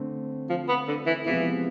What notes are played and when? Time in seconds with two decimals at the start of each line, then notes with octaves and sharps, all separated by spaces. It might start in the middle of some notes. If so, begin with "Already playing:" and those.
Already playing: D3 A3 C4
0.49 F3
0.69 B3
0.88 D3
1.07 E3
1.26 C3 E3 F3 G#3 B3 E4